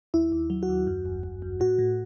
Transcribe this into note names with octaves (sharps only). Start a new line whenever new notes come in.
D#2 E4
D#2
F#3
F#4
D#2
F#2
G1
G1
F#2
A2 F#4
A2